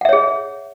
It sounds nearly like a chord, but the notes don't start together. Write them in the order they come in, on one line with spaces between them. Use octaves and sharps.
F#5 E5 C#5 G#4